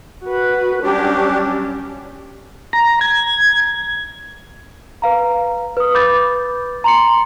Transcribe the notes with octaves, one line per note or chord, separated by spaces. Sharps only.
F#4 B4
F#3 G3 C#4 D4 G4
A#5
G#6
B4 F5 A#5
B4 D#6
B4 B5 D6 G6 A6
A#5 C6 C#7